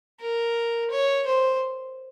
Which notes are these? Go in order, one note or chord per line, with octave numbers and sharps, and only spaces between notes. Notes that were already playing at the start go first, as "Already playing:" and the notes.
A#4
C#5
C5